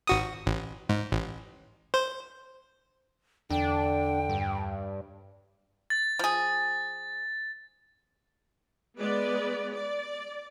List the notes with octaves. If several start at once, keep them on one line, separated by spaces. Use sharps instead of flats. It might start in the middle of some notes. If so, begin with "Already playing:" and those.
G#1 F#4 D#6
A1
G#2
A1
C5
E2 D3 D4 G5
G2
A6
F3 G#4
G#3 B3 B4 D5
D5